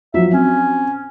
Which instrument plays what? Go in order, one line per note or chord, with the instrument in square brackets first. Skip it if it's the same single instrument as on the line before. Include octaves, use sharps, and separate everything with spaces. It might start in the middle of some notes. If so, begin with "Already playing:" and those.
[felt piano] F3 F#3 [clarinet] E5
[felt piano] C4 [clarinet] C#4